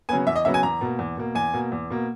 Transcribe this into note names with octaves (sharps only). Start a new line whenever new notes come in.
C#3 F#3 B3 G#5
E2 E5
D#5
C#3 F#3 B3 E5
G#5
E2 A#5
B2 A#3
E2
B2 A#3
E2 G#5
B2 A#3
E2
B2 A#3